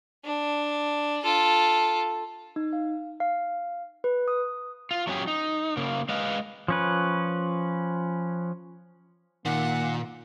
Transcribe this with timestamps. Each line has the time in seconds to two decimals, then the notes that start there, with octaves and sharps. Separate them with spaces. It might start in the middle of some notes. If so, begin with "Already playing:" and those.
0.25 D4
1.22 F4 A4
2.56 D#4
2.73 F5
3.20 F5
4.04 B4
4.28 D#6
4.91 F4
5.07 F#3 A3 C#4 E4 G4 G#4
5.28 D#4
5.77 C#3 A#3
6.09 G#3 B4 D#5 F5
6.68 F3 C#4 B4
9.45 A#2 D#3 A#3 F#5